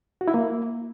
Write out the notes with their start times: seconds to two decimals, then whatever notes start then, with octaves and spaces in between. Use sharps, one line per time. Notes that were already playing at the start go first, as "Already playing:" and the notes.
0.21 F#4
0.28 E4
0.34 A#3